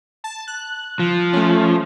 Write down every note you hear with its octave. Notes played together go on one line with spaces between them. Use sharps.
A5
F#6
F3
A3 C#4